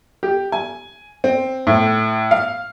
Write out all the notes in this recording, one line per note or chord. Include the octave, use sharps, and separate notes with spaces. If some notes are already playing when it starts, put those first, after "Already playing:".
G4
G#5
C4
A2
F5